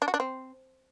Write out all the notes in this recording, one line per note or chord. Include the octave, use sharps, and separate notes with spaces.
D4
F#4
D4
C4